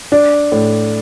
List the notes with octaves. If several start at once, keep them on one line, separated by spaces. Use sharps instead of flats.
D4
A2